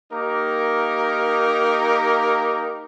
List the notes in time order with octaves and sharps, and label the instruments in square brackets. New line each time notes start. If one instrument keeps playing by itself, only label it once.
[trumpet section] A#3 D#4 G4 A#4